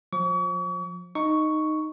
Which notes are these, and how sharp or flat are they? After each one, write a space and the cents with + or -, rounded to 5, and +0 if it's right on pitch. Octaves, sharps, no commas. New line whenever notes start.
F3 +25 C#6 +40
D#4 -5 C#6 +5